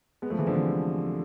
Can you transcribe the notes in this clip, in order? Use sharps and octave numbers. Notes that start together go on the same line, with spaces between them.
G#3 B3
F3 A3
E3 G#3
D3 F3
C3 E3